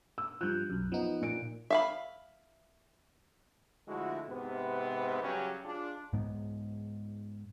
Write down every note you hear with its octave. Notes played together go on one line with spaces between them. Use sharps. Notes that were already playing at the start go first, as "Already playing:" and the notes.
E6
G2 F3 F#6 G6
B1 F#2
F3 B3 D#4
A#2 D7
E5 F5 B5
D3 F3 G#3 A3 E4 F#4
G#2 C3 B3
C#3 F#3 G3 C#4 G4
G#3 D4 F4
G#2 G#3 B3